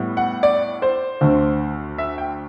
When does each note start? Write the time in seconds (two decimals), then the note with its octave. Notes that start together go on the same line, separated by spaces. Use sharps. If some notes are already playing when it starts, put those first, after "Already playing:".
Already playing: A2 G3 B3
0.17 F#5
0.43 D5
0.82 C5
1.21 D2 D3 A3 C4
1.98 E5
2.18 G5